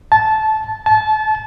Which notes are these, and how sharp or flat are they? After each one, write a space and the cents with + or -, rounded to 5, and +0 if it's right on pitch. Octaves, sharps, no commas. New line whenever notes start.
A5 -15
A5 -25